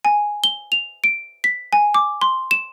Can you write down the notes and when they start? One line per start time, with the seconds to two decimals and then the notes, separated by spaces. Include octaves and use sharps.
0.05 G#5
0.44 G7
0.72 F7
1.04 D7
1.44 B6
1.73 G#5
1.94 D6
2.21 C6
2.51 E7